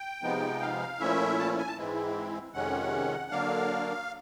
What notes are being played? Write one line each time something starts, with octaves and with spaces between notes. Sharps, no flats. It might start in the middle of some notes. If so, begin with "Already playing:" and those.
Already playing: G5
C3 F3 G#3 B3 D#4
F5
A#2 F3 A3 C#4 E4 E5
A5
G#5
A5
G#2 E3 G#3 C4 E4
F2 C3 D#3 G#3 C#4 F#5
D3 F#3 A#3 D4 F5